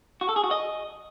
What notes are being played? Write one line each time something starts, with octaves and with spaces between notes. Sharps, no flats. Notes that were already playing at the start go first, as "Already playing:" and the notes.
F#4
A4
G#4
F#4
D#5